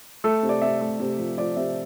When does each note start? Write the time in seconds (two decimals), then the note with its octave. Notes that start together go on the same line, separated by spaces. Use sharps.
0.24 A3 A4
0.43 C3
0.49 D5
0.62 C3 E5
0.81 A3
1.00 C3
1.19 F3
1.38 F3 D5
1.57 C3 E5